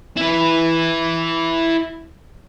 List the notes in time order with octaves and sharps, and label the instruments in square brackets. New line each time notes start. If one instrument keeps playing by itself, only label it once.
[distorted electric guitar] E4 B4